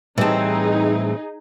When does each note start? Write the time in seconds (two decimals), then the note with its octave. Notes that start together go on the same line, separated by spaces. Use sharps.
0.18 A2 E3 G3 C4 D#4 G#4 A5